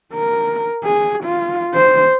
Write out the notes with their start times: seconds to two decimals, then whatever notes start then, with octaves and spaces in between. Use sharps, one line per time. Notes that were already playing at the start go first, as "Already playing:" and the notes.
0.13 A#4
0.84 G#4
1.23 F4
1.74 C5